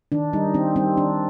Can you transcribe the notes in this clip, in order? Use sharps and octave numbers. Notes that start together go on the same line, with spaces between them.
D#3 D4
G3 D#4
D#3 C4
G3 C4
D#3 D4